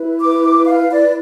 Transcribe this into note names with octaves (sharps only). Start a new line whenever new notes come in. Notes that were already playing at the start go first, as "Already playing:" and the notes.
Already playing: E4 B4
D6
F5
D5